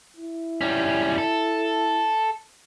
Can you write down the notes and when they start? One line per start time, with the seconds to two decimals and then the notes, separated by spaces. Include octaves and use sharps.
0.17 E4
0.61 G3 C#4
1.18 A4